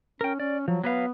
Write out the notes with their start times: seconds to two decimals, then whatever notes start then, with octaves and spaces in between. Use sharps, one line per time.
0.21 C#4 A#4 G5
0.40 C#4 D5
0.68 F3 F#3
0.84 F#3 B3 B4 F5